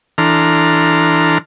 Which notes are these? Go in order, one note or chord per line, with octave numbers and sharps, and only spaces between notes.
E3 D4 A4 A#5 C6 F6